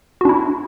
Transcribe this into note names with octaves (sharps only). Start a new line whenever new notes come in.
D4 E4 F#4